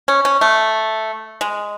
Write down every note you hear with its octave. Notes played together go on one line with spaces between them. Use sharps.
C#4
C#4
A3
G#3